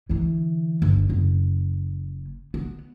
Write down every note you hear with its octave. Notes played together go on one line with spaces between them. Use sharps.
D3 E3
G1 D#2
F#1
B3